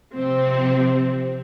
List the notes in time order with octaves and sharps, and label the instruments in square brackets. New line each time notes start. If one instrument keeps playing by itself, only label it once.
[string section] C3 F3 C4